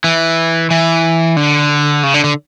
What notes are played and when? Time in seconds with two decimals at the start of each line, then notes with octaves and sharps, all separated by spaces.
0.04 E3
0.71 E3
1.37 D3
2.03 C#3
2.14 D3
2.24 D3